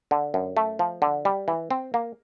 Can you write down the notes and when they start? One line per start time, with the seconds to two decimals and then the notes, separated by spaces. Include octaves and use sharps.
0.11 D3
0.34 F#2
0.57 A3
0.79 F3
1.02 D3
1.25 G3
1.48 E3
1.71 C4
1.94 A#3